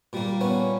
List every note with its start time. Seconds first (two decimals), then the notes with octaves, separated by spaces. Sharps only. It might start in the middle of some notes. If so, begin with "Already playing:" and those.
0.13 A#2 G3 A#3
0.41 B3 C#4